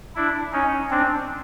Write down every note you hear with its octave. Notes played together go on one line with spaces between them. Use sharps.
D4 E4
C#4 D#4
C4 D4